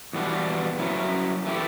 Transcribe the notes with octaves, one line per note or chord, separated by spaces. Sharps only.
E2 B2 G3 B3 D4
F#3 C#4 E4
E3 A3 E4 G4